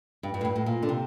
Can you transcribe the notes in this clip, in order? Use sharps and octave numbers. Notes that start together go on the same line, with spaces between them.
G2
G2
A2
G2
A2
A#2
D3
C3